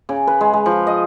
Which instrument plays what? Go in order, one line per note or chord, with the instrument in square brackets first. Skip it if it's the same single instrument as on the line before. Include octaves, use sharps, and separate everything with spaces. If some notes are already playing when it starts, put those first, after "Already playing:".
[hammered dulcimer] C#3
B4
G#3
G#3
F3
D#5